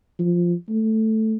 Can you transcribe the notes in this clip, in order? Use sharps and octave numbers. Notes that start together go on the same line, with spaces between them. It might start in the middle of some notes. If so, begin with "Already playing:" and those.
F3
A3